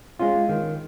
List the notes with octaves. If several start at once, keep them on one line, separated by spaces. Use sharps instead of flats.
G#3 C#4 F4
D#3